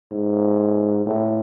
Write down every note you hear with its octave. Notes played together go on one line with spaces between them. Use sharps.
G#2
A2